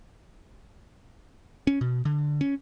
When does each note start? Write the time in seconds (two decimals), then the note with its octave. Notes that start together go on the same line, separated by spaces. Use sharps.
1.67 C#4
1.81 B2
2.05 D3
2.41 C#4